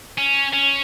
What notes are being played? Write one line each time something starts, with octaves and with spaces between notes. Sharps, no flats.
C#4
C#4